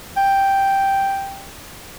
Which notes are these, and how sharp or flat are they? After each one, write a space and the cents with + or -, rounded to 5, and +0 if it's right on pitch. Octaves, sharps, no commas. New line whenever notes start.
G5 +0